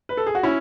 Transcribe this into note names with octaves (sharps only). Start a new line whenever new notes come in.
B4
A4
G#4
F#4
C#4 E4